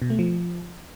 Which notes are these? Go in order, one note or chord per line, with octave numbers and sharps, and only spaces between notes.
B2
A3
F3